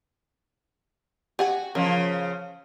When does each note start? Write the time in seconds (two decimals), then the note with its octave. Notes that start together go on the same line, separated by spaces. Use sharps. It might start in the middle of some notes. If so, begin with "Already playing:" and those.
1.39 F#4 G4 F#5 G#5
1.75 C#3 F3 A#4 D#5